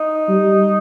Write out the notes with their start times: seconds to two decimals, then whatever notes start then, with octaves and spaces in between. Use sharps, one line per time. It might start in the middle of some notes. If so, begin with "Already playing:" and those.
Already playing: D#4
0.29 G3